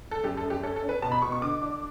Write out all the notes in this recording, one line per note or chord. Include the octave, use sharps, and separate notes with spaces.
A4
F#2 G4
A4
F#2
G4
C#4 A4
A4
C#4
B4
B2 A5
B5
B2 C#6
C#6
D3 D6
D4